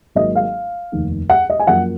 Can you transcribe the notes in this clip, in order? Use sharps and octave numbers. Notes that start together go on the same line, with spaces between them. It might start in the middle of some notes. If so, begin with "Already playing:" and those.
G#1 G#2 F#3 A#3 D#5
F5
F1 D#2 D#3
F#5
D#5
G#5
F#2 F3 A#3 F#5